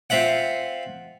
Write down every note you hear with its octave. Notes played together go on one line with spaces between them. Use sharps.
C4 F4 E5 F#5